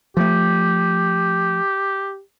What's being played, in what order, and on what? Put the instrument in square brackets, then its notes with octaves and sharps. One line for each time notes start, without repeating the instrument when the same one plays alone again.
[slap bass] F3 A3 [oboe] G4